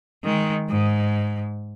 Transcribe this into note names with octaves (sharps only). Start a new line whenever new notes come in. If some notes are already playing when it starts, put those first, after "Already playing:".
D#3 G#3
G#2